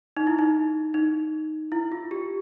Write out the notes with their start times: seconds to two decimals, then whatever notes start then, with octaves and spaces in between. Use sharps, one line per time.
0.17 D#4
0.27 E4
0.39 D#4
0.94 D#4
1.72 E4
1.92 F4
2.11 G4